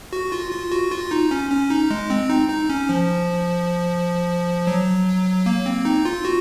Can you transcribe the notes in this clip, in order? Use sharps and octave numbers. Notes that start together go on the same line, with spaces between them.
F#4
F4
F4
F#4
F4
D#4
C#4
C#4
D#4
G#3
C4
D#4
D#4
C#4
F3
F#3
A#3
C4
D#4
F4
F#4